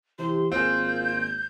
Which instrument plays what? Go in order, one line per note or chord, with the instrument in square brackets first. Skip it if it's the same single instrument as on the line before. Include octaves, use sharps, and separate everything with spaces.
[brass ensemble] C2 E3 G4 [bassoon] C3 [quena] C6
[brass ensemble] G#1 A#3 [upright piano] C4 G#4 [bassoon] F4 [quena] G6